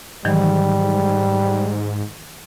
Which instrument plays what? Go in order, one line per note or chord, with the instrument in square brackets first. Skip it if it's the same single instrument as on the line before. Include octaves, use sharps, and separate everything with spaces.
[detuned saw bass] G#2 [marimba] D#3 E3 F#3 [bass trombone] G3